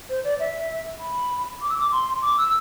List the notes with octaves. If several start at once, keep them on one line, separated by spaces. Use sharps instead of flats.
C5
D5
E5
B5
D6
E6
D6
C6
D6
E6